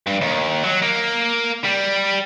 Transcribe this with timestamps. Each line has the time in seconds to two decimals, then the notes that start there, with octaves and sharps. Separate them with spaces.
0.07 G2
0.21 D#2
0.64 F#3
0.82 A#3
1.64 G3